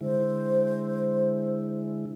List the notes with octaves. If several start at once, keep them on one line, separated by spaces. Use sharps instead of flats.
D3 G#3 E4 C5